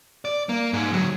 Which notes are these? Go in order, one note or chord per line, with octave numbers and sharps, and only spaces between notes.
D5
A#3
G#2 G#3
D2 F#3